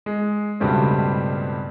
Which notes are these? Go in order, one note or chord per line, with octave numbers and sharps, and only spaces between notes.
G#3
C#2 G2 B2 G3 A3 C4